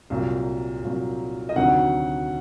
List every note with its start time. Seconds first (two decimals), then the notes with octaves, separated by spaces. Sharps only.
0.10 C2 A#2 F#3
0.83 C2 A#2 F#3
1.49 D#5
1.56 D2 C3 D#3 F#3 F#5